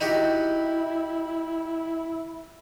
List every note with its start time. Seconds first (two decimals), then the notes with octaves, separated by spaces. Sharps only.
0.01 D#4 E4 F#4 G4